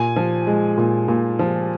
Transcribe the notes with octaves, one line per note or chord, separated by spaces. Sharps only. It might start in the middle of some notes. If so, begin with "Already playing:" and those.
Already playing: A#2 G#5
F3
G#3
A#2
A#2
F3